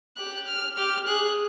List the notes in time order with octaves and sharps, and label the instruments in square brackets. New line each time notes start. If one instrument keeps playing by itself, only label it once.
[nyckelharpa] G4 [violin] F#6
[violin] F6
[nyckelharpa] G4 [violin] F6
[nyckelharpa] G#4 [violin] F#6